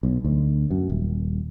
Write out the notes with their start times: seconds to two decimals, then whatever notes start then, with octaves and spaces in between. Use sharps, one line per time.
0.03 B1
0.24 D2
0.71 F#2
0.89 D#1